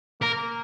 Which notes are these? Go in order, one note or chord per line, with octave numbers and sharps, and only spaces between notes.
A#3 A#4